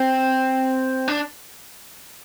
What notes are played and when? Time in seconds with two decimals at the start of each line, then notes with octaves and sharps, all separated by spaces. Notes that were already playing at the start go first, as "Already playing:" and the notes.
Already playing: C4
1.08 D4